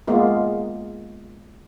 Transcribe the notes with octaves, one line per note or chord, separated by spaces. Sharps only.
G#3 A#3 B3 F4